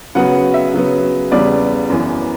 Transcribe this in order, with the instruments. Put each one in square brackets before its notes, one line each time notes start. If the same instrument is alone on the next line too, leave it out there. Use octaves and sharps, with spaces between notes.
[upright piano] C#3 F#3 B3 F#5
E5
C#3 F#3 B3
E2 C#3 G3 B3 D5
F#2 E3 B3